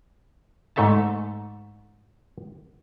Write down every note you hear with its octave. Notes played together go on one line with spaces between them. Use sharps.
G#2 A3 A4 E5 A5